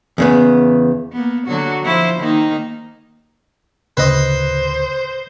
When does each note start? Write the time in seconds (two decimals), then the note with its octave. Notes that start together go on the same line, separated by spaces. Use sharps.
0.18 E2 C#3 B3
1.12 A#3 B3
1.47 D3 F#3 F#4
1.82 F3 E4 C5
2.19 D#3 A#3 D#4
3.97 D2 A2 C#3 B4 C5 D#5